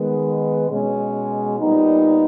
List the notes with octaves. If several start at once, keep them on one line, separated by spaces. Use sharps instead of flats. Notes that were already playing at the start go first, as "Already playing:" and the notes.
Already playing: D#3 G#3 B3
B2 G#3 C#4
A#2 G3 B3 D#4